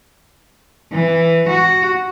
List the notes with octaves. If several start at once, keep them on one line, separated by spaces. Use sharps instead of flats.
E3
F#4